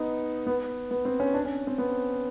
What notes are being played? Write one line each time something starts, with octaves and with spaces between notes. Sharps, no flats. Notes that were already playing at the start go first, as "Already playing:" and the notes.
Already playing: B3 D#4
B3
B3
C4
C#4
D4
C#4
C4
B3